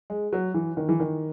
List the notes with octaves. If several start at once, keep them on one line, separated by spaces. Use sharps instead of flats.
G#3
F#3
E3
D#3
E3
D#3